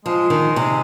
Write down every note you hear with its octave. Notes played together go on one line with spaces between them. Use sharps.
F3 G#3
D#3
C3